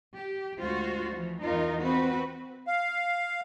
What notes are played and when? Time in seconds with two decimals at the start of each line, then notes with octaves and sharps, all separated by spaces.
0.14 G4
0.58 D2 G#3 F4 F#4 C5
1.12 E3 F3
1.42 E2 E3 D#4 F4 A#4
1.81 C4 F#4 B4
2.67 F5